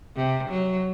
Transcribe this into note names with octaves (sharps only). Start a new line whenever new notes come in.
C3
F#3